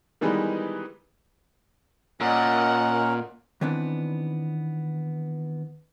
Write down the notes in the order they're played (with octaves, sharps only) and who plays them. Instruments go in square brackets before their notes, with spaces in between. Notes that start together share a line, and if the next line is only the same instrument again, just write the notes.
[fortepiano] D#3 E3 G3 G#3 B3 D#4
[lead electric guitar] A#2 [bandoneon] C#4 A#4 [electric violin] D#5 F#5
[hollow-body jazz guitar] D#3 E3 B3 C4 D4